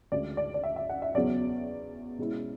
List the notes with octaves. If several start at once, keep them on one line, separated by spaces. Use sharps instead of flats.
D2 C#3 G#3 D5
D5
D5
E5
E5
F#5
E5
E2 C#3 F#3 C#4 D5
B2 G#3 C#4 E4